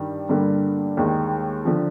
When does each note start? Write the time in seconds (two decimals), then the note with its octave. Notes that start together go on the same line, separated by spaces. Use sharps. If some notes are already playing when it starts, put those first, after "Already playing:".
Already playing: G2 D#3 G3
0.29 G2 D3 G3 A#3
0.97 D#2 D#3 G#3
1.65 D3 F3